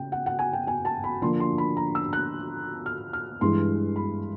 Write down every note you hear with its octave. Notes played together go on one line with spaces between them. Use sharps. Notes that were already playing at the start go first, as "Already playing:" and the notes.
Already playing: C#3 G5
F#5
F#5
G#5
G5
G#5
A5
B5
D3 F3 A#3 D4 C6
C6
B5
A#5
E6
F#6
F6
F6
G2 E3 G#3 C6
B5